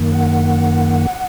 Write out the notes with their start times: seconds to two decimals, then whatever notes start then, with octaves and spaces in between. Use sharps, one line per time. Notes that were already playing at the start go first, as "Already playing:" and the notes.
Already playing: F#2 D#3 A#3
0.12 F#5